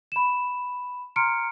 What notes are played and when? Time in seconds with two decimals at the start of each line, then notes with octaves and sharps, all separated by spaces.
0.12 B5 E7
1.16 A#5 C6 F6 C#7 D7